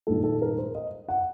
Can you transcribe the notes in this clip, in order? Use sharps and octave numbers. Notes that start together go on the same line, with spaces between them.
A#1 G#2 D#3 G3 A4
A4
A#4
C5
D#5
F#5